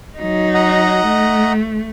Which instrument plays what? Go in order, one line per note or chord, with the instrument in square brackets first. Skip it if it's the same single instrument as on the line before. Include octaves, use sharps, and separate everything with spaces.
[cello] F#3 D#4
[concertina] D#5 F#5 A#5
[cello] A3